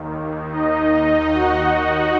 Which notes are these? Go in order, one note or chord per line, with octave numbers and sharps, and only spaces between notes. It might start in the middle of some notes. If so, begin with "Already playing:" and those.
Already playing: D#2 D#3
D#4 D#5
F#4 F#5